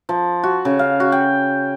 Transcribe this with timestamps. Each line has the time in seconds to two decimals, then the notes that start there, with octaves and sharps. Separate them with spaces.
0.09 F3
0.43 F#4
0.65 C#3
0.79 F5
1.00 F#4
1.12 G5